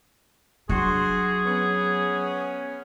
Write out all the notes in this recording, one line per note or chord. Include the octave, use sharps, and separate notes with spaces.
F#3 D4 F#4 G#4 C6
B3 C#4